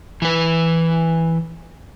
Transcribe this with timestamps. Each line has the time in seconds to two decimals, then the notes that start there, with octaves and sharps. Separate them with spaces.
0.22 E3 B4